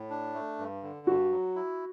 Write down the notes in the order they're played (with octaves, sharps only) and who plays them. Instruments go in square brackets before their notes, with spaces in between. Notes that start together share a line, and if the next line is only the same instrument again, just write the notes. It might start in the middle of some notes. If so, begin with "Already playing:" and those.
Already playing: [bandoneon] A2
D4
A3
G2
D3
[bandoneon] G2 [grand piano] F#4
[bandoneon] F#3
E4